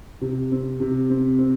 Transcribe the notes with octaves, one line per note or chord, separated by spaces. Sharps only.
C3
C4
C3
C4
C4